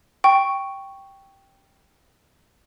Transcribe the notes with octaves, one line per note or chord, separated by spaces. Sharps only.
G5 C#6